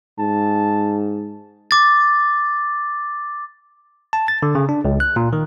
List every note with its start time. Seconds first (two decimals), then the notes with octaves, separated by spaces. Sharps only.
0.19 G#2 A5
1.71 D6 A6
4.13 A5
4.28 A6
4.43 D3
4.55 C#3
4.69 D4
4.85 C#2
5.00 F#6
5.16 A#2
5.33 D#3